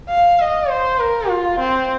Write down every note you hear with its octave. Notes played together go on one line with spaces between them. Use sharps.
F5
D#5
C5
A#4
F4
C4